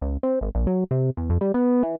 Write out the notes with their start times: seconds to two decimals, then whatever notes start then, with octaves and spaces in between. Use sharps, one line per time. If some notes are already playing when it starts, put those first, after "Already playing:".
0.01 C#2
0.23 C4
0.41 G#1
0.55 A#1
0.67 F#3
0.91 C3
1.17 E2
1.30 F2
1.41 G3
1.54 B3
1.83 E3